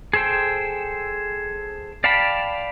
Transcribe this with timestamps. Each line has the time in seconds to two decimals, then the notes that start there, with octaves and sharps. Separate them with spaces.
0.13 G#4 A4 C5 G5
2.04 D5 F5 G5 A5 B5